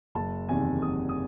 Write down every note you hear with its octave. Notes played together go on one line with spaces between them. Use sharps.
F#1 A5
E2 C3 D#3 G#5
F#1 D#6
D#6